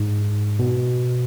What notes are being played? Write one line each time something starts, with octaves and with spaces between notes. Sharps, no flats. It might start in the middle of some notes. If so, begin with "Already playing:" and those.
Already playing: G#2
B2